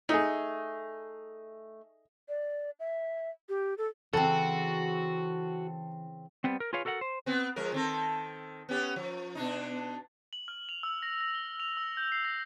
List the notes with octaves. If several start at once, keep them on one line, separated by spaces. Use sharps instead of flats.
A3 D#4 G#4
D5
E5
G4
A4
C#3 E3 C4 F#4 A4
G3 B3 C4
A#4
F4 G#4 B4 C#5 F5
F#4 A4 A#4 F5 F#5
C5
B3 C4
F3 G#3 A#4
D#3 C4 A4
B3 C#4 G4
F3
B2 D4 D#4
F#7
F6
F7
E6
A#6
A#6
G7
F7
E6
G6
C7
A#6